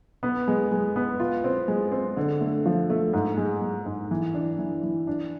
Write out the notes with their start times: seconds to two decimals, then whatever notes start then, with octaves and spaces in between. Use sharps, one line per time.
0.23 B3
0.48 G#3
0.72 G#3
0.96 B3
1.20 F4
1.44 C4
1.68 G#3
1.92 C4
2.17 D3
2.41 A3
2.66 F3
2.90 A3
3.13 G#2
3.37 G#3
3.61 G#3
3.86 G#2
4.11 E3
4.34 D4
4.59 E3
4.83 E3
5.07 D4